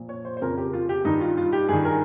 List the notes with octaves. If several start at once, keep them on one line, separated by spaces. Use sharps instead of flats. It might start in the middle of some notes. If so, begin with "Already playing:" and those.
Already playing: A#2 F3
C#5
C5
C5
F2 C#3 F3 A#4
G4
F4
G4
G2 D#3 D#4
F4
F4
G4
G2 D#3 G#4
A#4